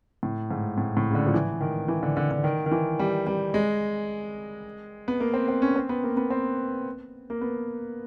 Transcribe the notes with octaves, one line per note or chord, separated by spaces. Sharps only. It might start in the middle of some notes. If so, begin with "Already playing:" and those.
A2
G#2
A2
A2
C#3
D3
F3
E3
D#3
E3
D3
D3
D3
D#3
D#3
E3
G3
G3
G#3
B3
A#3
C4
C4
C#4
C4
B3
A#3
B3
C4
A#3
B3